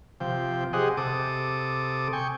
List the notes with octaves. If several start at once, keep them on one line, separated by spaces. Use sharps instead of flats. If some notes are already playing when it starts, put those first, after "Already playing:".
C3 F3 G5
G4 G#4 C5 D#5 F#5
C3 A4 D6 D#6
G5 G#5 C#6